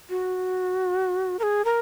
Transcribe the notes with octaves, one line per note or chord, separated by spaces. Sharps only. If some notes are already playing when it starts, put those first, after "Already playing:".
F#4
A#4
G#4
A#4